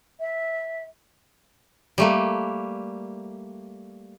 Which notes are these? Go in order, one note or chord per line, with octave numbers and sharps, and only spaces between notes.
E5
G3 A3 A#3